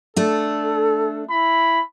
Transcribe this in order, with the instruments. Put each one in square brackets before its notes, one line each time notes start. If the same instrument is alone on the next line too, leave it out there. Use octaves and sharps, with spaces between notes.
[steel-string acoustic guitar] A3 D4 [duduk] A4
[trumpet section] E4 B5